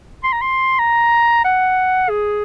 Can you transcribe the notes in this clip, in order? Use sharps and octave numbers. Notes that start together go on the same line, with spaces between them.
C6
A#5
C6
A#5
F#5
G#4